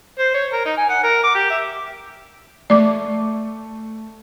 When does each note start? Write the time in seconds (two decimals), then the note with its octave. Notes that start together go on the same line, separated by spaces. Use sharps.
0.19 C5
0.34 C#5
0.53 A#4
0.66 D#4
0.77 G#5
0.90 F#5
1.04 A#4
1.24 D6
1.35 G4
1.50 E5
2.70 A3 D5 D6